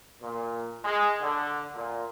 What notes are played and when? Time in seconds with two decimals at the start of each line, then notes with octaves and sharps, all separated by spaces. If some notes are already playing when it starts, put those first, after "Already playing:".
0.21 A#2
0.84 G#3
1.22 D3
1.75 A#2